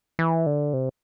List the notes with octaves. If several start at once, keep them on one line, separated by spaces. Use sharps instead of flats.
E3
D3
C3